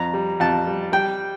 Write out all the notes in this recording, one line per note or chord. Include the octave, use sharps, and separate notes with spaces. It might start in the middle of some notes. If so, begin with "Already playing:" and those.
Already playing: F2 A#5
G3
F2 A5
G3
G3 G5